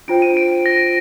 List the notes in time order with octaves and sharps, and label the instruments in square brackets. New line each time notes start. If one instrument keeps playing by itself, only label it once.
[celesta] D4 F4 C5 G5 [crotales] D7
[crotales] D#7
D7
A#6